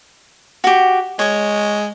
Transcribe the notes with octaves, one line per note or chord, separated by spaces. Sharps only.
F#4 G4
G#3 C#5